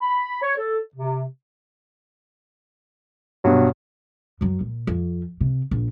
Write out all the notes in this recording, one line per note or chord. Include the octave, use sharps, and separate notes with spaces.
B5
C#5
A4
C3
G2 B2 F#3
F#2 F#3
A#2
F2
C3
A#1